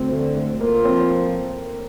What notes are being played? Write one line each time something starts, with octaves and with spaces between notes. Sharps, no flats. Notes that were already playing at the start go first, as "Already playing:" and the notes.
Already playing: D2 C4
D3 A3
D2 A3
A#3 F4
F3 C4